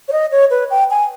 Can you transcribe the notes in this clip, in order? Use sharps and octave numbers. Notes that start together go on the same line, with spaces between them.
C#5
D#5
C#5
B4
G5
G#5